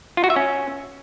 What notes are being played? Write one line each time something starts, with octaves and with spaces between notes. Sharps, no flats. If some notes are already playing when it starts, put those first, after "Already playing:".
F4
F#4
E5
C#4